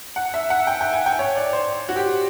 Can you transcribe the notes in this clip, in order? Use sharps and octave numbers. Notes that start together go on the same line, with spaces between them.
F#5
E5
F#5
G5
G5
G#5
G5
C#5
D5
C5
F#4
G4